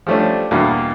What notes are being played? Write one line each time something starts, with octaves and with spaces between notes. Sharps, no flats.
F3 G3 A3 C#4 D4
E2 G2 B2 A#3